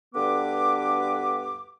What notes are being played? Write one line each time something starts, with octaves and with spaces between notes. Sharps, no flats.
D2 G2 D3 B3 B4 D6